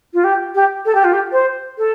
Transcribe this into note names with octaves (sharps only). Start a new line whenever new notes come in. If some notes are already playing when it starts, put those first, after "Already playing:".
F4
G4
G4
A4
G4
F4
G4
C5
A4